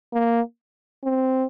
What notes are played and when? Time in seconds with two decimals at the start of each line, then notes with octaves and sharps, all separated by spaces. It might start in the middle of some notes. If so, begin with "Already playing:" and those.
0.13 A#3
1.04 C4